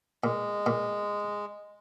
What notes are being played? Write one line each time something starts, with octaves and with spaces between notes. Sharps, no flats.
A#2 G#3
A#2